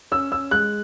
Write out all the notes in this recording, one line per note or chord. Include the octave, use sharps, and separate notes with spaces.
C#4 E6
C#4 E6
G#3 F#6